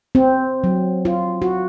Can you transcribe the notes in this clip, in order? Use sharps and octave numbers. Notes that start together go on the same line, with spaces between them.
C4
F#3
F4
F#4